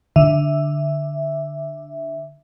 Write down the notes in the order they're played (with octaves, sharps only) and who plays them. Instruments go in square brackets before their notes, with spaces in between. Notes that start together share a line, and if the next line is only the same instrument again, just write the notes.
[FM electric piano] D3 E5